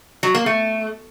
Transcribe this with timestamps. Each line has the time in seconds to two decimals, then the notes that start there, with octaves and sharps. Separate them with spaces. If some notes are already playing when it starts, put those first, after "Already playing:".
0.23 F#3
0.35 A#3
0.46 A3